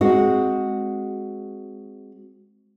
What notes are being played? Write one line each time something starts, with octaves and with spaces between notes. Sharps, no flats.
G#3 C4 F#4